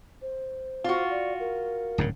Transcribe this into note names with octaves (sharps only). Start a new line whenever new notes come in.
C5
F4 F#4
D5
A#4
D1 G#2 C#3